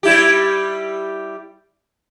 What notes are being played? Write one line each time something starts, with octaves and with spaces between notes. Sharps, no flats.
G3 E4 G4